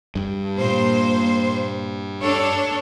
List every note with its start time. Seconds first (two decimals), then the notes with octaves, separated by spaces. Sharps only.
0.16 G2
0.56 A#2 C5
2.21 D4 A4 C#5